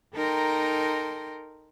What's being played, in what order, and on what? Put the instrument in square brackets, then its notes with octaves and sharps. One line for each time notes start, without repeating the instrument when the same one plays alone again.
[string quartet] D#4 A4 A#4 G5 A#5 C6